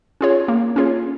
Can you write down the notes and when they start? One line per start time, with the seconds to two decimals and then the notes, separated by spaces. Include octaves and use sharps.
0.21 C#4 F4 G#4 C#5
0.48 A#3
0.76 C#4 F4 G#4 C#5